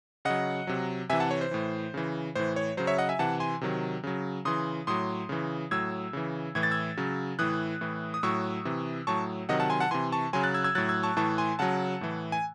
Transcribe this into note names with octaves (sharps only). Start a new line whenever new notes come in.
C#3 F#3 D#5 F#5
C3 F#3
C3 E3 E5 G#5
F#5 A5
C#5
C5
A2 E3
C#3 E3
A2 E3 C5
C#5
C#3 F#3 C5
C#5 E5
D#5 F#5
E5 G#5
C3 E3 F#5 A5
G#5 C6
C3 D#3 F#3
C#3 F#3
C#3 E3 C6 D#6
A2 F#3 C6 D#6
C#3 E3
A2 F#3 E6 G#6
C#3 E3
A2 E3 G#6
A6
E6 G#6
C#3 F#3
A2 E3 D#6 F#6
A2 E3
D#6
A2 F#3 C#6 E6
C3 E3
A2 F#3 A5 C#6
C3 D#3 F#3 D#5 F#5
F#5 A5
G#5 C6
F#5 A5
C3 E3 G#5 C6
A5 C#6
C#3 F#3 G#5 C6
F#6 A6
E6 G#6
E6 G#6
A2 F#3 F#6 A6
E6 G#6
A5 C#6
A2 E3 A5 C#6
G#5 C6
C#3 F#3 F#5 A5
A2 E3
G#5